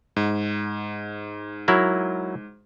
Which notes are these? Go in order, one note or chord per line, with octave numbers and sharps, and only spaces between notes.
G#2
F#3 E4 A#4